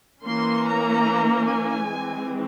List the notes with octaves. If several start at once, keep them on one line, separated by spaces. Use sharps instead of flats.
E3 A#3 C#4 C6
A#5
G#5
E3 G#3 C4